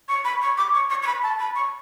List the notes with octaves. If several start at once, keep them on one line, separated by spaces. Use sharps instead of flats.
C#6
B5
C#6
D6
C#6
C#6
C#6
B5
A5
B5
C#6